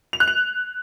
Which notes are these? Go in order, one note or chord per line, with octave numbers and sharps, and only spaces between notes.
F7
F#6
F7